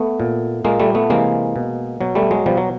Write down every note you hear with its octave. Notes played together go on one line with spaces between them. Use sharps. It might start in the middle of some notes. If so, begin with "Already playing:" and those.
Already playing: A3 B3
A#2
A#2 G#3 A#3
G3 A3
A3 B3
C3 E3 G#3 A#3
B2
B2 F#3
G3 A3
F#3 G#3
B2 F3 G3
F#3